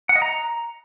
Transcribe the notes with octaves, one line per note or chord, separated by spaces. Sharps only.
F#5
D#5
A#5